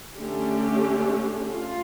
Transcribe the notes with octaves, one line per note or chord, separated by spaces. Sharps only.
D3 A3 C#4 G4
F4